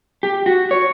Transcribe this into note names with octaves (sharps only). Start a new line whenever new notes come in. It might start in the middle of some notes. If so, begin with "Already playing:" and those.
G4
F#4
C#5